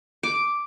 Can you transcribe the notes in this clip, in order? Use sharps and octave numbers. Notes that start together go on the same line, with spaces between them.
D6